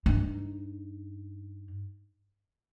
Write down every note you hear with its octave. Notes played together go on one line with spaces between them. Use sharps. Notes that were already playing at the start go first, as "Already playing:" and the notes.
G2 D#4